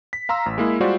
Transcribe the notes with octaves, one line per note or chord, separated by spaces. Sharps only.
B6
F5 A#5 C6 E6
A1
G#3 A#3 E4 G#4
G3 G#3 F4 F#4 C5 D5